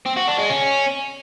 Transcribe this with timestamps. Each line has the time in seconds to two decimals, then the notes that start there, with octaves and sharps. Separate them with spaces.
0.06 C4
0.17 F#4
0.28 D4
0.38 G#3
0.49 C#4